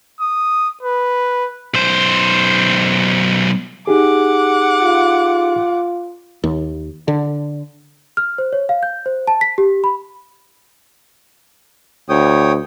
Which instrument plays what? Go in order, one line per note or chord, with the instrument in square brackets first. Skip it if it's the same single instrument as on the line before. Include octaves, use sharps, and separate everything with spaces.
[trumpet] D#6
B4
[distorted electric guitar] B1 C5
[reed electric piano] D#4 G4 G#4 [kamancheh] F#5 D6
[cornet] F4
[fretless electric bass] D#2
D3
[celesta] F6
C5
C#5
F5
G6
C5
A5
B6
G4
B5
[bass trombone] D2 [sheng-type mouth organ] C#5 G5 D#6